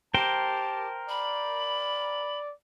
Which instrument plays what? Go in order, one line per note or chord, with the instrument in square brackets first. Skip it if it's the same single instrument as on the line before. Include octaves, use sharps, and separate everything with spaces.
[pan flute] G4 [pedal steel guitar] A#4 C5 G5 [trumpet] A5
[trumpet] D5 [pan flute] B5